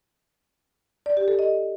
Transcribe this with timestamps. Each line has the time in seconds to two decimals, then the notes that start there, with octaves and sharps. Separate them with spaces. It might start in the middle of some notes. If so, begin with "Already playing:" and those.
1.06 D5
1.17 G4
1.28 A4
1.39 D#5